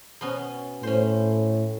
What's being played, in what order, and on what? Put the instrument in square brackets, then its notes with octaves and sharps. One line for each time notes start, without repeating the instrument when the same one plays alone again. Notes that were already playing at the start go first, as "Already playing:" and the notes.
[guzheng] B2 B3 C#4
[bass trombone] A2 [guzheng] C#4 C5